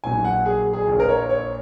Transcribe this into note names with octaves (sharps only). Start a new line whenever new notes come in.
A#1 A#2 F#3 G#5
F#5
G#4
G#4
A#1 A#2 A#3
A#4
C#5
C#5